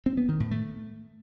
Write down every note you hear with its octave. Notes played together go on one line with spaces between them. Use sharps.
C4
B3
D#3
A2
A3